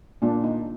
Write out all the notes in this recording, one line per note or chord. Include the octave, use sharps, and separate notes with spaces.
A#2 D4
D#4